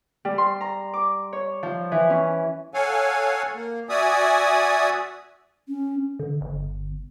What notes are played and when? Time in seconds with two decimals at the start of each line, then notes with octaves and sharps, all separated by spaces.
0.25 G3
0.38 C6
0.61 A#5
0.94 D6
1.33 C#5
1.63 F3
1.92 E3
2.10 C#4
2.74 A4 C#5 F5 F#5 G#5
3.54 A#3
3.89 F#4 D5 E5 G#5 D#6
5.68 C#4
6.19 D3
6.41 G1